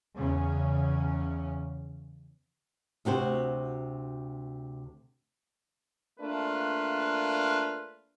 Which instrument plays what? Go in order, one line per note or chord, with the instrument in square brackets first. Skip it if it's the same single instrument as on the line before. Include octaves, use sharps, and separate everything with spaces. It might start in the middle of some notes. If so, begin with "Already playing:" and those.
[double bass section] E2 C#3 C#4
[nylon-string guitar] D2 C3 F#4 C5
[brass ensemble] A3 A#3 D4 F4 B4